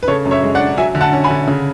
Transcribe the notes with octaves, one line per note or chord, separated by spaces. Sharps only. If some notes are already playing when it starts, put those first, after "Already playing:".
B4
C#3 A4 C#5
F#2
C#5 E5
G#3
D5 F#5
D4
F#3 E5 G#5
D3
F#5 A5
C#4
G#5 B5
D3
C#3